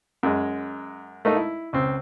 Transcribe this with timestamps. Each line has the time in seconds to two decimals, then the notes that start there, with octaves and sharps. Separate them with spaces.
0.23 F#2 G#3
1.25 A3 A#3 D#4
1.36 E4
1.73 C#2 C4